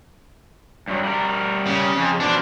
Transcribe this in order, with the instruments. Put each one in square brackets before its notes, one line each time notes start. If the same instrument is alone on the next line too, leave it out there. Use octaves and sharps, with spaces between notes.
[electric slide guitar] G2 F#3
G3 A#4
[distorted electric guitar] C#3
[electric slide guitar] F2
[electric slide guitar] B2 D3 F3 [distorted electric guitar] D4